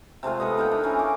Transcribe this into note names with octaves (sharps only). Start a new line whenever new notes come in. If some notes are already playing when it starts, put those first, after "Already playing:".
C3 G#3 A3 F4
B3 A4 B4 D#5
A#3 D#4 A#4 G5
D4
E3 C#4 G#4 A#4
D6